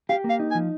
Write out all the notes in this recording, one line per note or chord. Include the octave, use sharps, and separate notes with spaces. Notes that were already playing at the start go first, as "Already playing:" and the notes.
G4 F5
A#3
F5
D#4
G#5
F3